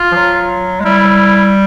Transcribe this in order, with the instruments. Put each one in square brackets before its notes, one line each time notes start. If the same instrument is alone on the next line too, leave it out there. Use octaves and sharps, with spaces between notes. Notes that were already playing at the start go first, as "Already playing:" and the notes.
Already playing: [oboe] F4
[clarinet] F3
F#3
G#3
[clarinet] G3 [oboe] E4